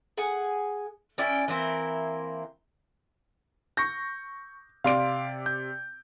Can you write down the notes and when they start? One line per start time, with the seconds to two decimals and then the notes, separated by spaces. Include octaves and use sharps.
0.17 G#4 F#5 G#5
1.18 C#4 E4 D5 G5
1.48 E3 A#3 C4 E4
3.77 C#6 G6 A#6
4.84 C3 D5 F5 C6 D7
5.46 G6